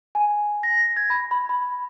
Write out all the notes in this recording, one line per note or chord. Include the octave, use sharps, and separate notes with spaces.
G#5
A#6
G#6
B5
B5
B5